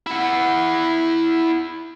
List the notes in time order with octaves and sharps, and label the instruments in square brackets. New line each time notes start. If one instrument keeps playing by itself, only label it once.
[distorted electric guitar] E4 F#5